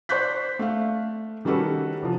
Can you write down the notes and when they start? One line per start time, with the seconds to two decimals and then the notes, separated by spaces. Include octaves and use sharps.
0.09 C5 D5 C#6 F#6 G6 B6
0.59 A3 F5
1.45 D#3 G3 C#4 F#4 A4 B4
2.03 F1 F3